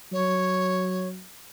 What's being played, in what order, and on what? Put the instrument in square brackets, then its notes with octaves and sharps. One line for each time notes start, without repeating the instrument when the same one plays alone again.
[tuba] F#3 [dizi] C#5